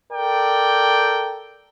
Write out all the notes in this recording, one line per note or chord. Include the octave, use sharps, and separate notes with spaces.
A4 A#4 D5 G5